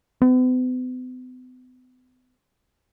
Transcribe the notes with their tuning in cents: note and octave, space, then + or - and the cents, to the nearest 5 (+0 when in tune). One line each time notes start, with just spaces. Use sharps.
B3 +45